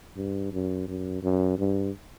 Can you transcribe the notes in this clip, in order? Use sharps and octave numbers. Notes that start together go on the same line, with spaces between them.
G2
F#2
F#2
F#2
G2